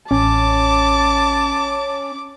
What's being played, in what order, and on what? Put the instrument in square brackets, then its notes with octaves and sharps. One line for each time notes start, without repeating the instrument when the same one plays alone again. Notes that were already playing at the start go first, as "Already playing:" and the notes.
[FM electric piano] A1 [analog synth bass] C#4 [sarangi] A5 [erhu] D6